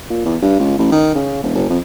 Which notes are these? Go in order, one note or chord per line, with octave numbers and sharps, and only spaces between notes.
A#2
E2
G2
C#2
A1
D#3
C#3
E1
F#1
F2